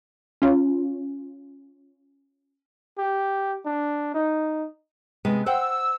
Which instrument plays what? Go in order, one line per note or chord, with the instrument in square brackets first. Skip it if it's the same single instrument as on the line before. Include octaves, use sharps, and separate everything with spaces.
[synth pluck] C#4 F4
[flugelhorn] G4
D4
D#4
[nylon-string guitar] C3 G#3 B3
[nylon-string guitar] C5 F#5 G5 [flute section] E6